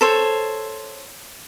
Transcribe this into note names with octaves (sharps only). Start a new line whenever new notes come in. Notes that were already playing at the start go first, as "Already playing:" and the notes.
A4 C5 C#5